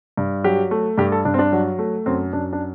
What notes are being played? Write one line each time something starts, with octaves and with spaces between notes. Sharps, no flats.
G2
F#3 G4
A3
G2 G4
A4
G2 D4
C4
D4
F#3
A3
F#2 C4
F#2 D4
D4